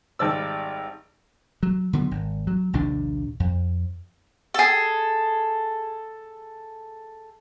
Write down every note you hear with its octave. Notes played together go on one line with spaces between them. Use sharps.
G#1 G3 D5 E6
F#3
D3 F#3 B3
G#1
F#3
A#1 D#2 C3 D4
F2
G#4 A4